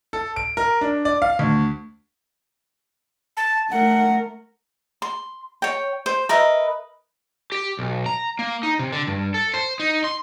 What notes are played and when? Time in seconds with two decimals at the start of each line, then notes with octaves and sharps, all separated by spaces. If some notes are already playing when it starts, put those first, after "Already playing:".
0.13 A4
0.36 D7
0.57 A#4
0.81 D4
1.05 D5
1.22 F5
1.39 D2
3.37 A5
3.71 A3 A#4 F#5
5.02 C6
5.62 C#5 G5
6.06 C5
6.29 A#4 B4 D#5 E5
7.52 G4
7.79 B1
8.06 A#5
8.39 A#3
8.63 D#4
8.79 C3
8.93 D3
9.07 G2
9.34 A4
9.54 C5
9.80 D#4
10.04 C6